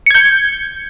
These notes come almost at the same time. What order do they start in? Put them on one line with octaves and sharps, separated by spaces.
C#7 G#6 G6